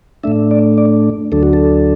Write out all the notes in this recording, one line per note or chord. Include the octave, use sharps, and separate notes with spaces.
A2 A3 D4 E5
D5
D5
D2 D3 F#3 D4 A4
F#4
A4